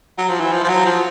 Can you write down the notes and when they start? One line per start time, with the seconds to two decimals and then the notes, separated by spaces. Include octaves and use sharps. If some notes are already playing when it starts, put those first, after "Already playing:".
0.18 F#3
0.29 F3
0.40 E3
0.52 F3
0.64 F3
0.69 F#3
0.86 F3